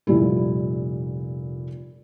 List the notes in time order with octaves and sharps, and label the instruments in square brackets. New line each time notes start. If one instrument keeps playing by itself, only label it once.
[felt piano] F1 A#2 G3 E4